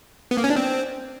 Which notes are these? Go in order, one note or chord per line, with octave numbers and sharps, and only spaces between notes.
B3
A#3
C#4
D4
C4